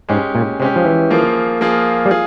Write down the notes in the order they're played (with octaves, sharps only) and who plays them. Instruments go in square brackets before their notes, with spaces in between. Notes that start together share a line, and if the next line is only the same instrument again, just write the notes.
[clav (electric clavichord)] G#2 [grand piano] G#3 C#4 G4
[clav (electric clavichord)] A#2
[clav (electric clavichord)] C3 [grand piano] G#3 C#4 G4
[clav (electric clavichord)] F3
E3
[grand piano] F3 A#3 F4 G#4
F3 A#3 F4 G#4
[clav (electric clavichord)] G3
[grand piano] F4 G#4